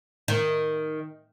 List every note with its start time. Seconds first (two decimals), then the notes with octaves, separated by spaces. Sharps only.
0.28 D#3